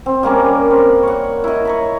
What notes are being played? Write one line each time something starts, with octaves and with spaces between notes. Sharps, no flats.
C4
G3 A#3 C#4 A#4
C4
C#5 F#5
E4 D#5
C#5 A#5 B5